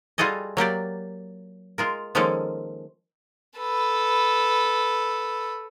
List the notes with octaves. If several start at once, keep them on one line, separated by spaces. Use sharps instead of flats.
G3 F4 F#4 G#4 A4 D#5
F#3 A#3 G4 D5
G#3 F4 A#4
D#3 F3 G#3 A#3 C#4 A4
A4 B4